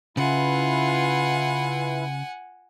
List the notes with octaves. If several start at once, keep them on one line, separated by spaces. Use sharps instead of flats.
C#3 E4 F4 B4 F#5 G#5